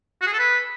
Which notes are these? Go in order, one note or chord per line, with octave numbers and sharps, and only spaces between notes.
F#4
G#4
A4
B4